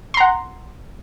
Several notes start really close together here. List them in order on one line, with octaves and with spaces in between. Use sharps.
C6 A#5 F#5